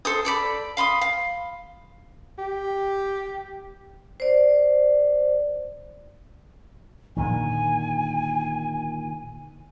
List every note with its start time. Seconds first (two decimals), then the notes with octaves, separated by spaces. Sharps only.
0.05 A4 C5 D#6
0.25 A4 D5 B5
0.77 F5 B5 C6 D#6
1.01 F5
2.38 G4
4.20 C5 D5
7.17 A#2 D3 D#3 G#5